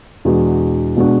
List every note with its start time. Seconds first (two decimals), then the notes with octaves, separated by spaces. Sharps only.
0.25 E2 B2 G#3 D4 F#4
0.97 B2 G#3 D4 F#4